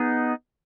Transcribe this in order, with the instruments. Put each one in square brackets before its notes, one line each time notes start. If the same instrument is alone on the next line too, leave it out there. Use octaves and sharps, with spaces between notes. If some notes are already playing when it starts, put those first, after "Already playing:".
Already playing: [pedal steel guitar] B3 D#4 G#4